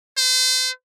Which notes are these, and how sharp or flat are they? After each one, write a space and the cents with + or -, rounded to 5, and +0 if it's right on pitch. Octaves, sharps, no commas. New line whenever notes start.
C5 -35